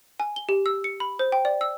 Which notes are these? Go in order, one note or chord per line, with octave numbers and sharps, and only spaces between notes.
G#5
G7
G4
E6
C#7
B5
C5
G5
D5
E6